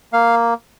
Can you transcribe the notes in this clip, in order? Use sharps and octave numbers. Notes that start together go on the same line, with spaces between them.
A#3 F5